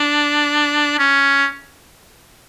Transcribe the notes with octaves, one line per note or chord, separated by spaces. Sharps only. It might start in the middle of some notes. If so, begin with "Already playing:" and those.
Already playing: D4
C#4